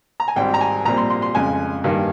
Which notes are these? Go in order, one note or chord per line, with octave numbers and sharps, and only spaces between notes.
A#5
G#5
G#1 G#2 G3 C4 G5
A#5
G#5
A#1 A#2 G3 C4 A#5
C6
C6
C6
F2 C#3 G#3 G#5
G2 D#3 A#3